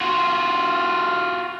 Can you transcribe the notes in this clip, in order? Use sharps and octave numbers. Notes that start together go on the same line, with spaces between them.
F4 F#4